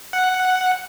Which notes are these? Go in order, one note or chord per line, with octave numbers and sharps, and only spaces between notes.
F#5